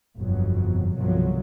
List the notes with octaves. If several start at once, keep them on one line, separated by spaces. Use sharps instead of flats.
G1 F2 B2 F#3
C2 G2 B2 D3 F3 F#3